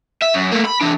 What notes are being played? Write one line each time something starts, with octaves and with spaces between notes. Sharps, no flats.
E5
F#2
A3 A#3
B5
E3 D4